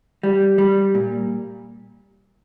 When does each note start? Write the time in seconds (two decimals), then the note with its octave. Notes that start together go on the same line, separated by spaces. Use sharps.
0.23 G3
0.58 G3
0.95 A#2